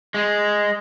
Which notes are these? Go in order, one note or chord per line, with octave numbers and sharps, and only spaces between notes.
G#3